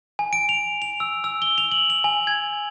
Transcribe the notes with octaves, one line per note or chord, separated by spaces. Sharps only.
G#5
D7
F7
F7
E6
E6
G7
F7
F#7
F7
G#5
G#6